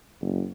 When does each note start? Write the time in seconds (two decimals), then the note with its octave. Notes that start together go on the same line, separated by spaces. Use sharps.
0.21 F#1